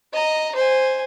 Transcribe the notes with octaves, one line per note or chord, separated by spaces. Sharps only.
D#5 A#5
C5 G#5